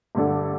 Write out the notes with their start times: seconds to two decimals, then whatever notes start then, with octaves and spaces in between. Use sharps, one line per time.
0.15 G2 D3 A3 D4 A4